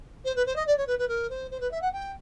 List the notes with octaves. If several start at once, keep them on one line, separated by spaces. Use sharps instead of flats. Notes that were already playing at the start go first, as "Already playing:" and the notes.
C5
B4
C5
D#5
D5
C#5
B4
B4
A#4
C5
C5
B4
E5
F#5
G5